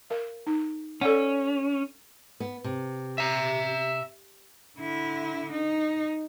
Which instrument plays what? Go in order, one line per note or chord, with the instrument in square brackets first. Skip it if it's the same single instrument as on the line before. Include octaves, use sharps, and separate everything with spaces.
[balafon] A#4 F5
D#4
[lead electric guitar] C#4 [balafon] A4 D5 F#5
[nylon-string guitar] B3
C3
[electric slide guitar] E5 A#5
[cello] D3 E4
D#4